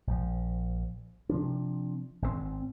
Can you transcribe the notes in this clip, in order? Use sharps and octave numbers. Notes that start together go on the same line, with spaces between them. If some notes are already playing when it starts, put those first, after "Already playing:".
A#1 F3
C3 F3 D4
G#1 G#2 C3 C4